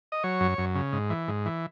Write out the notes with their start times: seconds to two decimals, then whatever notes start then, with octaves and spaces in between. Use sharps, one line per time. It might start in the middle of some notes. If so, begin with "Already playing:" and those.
0.12 D#5
0.23 F#3 C#5
0.40 F#2
0.58 F#2
0.75 C#3
0.93 G#2
1.10 E3
1.28 G#2
1.46 E3